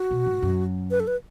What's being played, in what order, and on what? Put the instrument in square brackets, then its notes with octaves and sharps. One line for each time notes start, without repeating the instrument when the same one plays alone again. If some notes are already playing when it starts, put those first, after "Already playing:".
Already playing: [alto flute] F#4
[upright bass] B2
G#2
F#2
[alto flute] B4
A4
B4